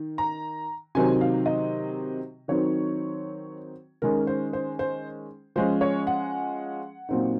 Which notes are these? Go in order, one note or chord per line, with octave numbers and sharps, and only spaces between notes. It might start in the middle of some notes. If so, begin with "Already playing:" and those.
Already playing: D#3 D#4
A#5
C3 D#3 F#3 C4 D#4 G#5
F5
D#5
D#3 F#3 C4 D#4 C#5
D#3 G#3 C#4 A#4
C5
C5
C5
F3 G#3 C#4 C5
C#5
F#5
A#2 F#3 C4 D#4